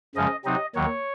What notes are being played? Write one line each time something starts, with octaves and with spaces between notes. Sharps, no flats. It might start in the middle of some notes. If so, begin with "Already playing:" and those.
F#2 C#3 F3 G#3 C#4 D#5
C3 F#3 C4 D#4 D#5
D#2 D#3 F#3 C#5